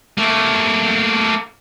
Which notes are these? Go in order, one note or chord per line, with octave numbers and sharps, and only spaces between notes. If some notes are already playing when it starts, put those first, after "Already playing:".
A3 A#3